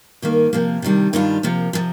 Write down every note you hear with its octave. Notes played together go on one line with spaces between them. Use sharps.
G2 D#3 A#3
C3 F3 A#3
C3 D#3 G3 D4
G2 D#3 G3 D4 F4
C3 F3 A#3
C3 F3